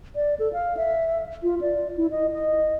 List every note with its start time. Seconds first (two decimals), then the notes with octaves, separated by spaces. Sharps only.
0.16 D5
0.39 A4
0.53 F5
0.77 E5
1.43 F4
1.61 D5
1.98 E4
2.11 D#5
2.32 D#5